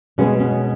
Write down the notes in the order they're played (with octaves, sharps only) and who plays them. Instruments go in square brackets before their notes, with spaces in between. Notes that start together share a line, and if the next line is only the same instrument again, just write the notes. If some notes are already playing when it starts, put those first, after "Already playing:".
[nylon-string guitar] B2 G#3 B3 C#4
C#4